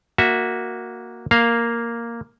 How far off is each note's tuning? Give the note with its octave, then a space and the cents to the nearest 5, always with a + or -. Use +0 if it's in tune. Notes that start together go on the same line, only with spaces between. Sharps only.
A#3 +0 F#4 -10 E5 +0
A#3 +0 F5 +0